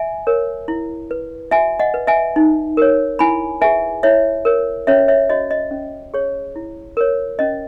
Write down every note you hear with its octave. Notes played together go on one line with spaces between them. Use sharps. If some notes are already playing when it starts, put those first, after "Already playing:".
Already playing: E5 G#5
A#4 C#5
E4
B4
F#4 E5 G#5
D#5 F#5
B4
E5 G#5
D#4
A#4 C#5
E4 G#5 B5
G#4 B4 E5 G#5
E4 C#5 E5
A#4 C#5
C#4 C#5 E5
C#5 E5
F#4 C#5 D#5
D#5
C#4
G#4 C#5
E4
A#4 C#5
C#4 D#5